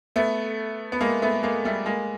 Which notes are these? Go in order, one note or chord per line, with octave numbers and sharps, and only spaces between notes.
A3 B3
B3
G#3 A#3
A3 B3
G#3 A#3
G3 A3
G#3 A#3